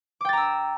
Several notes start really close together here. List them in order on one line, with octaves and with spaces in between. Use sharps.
D6 G5 A6 A#5 E6